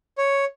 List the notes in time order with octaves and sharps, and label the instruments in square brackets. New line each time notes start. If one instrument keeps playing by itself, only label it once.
[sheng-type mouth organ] C#5